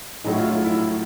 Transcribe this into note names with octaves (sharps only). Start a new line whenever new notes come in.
A#1 A2 F#3 A3 D#4
E4
F4
F4
E4